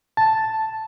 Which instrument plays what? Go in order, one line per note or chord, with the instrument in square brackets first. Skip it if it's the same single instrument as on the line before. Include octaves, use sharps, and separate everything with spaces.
[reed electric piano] A5